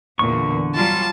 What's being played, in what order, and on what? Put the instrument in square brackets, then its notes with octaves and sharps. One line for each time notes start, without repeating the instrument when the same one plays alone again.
[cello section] E2 A#2 [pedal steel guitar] D3 C#6
[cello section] F#3 G3 F4 [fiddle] A5